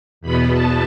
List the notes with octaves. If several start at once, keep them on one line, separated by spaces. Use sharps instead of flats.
E2 B2 B3 B5
A5